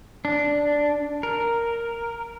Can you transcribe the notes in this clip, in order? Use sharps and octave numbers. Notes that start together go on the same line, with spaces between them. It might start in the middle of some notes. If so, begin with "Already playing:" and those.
D4
A#4